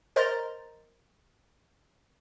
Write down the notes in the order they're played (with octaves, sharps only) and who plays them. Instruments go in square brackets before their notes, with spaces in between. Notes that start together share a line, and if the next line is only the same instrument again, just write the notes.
[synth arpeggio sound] A#4 C5 D#5 A#5 C6 A6